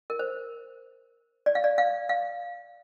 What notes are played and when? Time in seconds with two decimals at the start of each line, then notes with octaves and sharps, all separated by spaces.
0.10 A#4
0.19 C5
1.46 D5
1.55 F5
1.64 D5
1.78 F5
2.09 F5